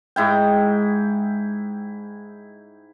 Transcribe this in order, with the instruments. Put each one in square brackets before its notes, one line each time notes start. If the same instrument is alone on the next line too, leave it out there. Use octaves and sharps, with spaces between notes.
[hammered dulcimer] G#2 E4 G5